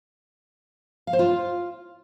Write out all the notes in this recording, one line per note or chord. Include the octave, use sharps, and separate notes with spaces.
F5
C5
F4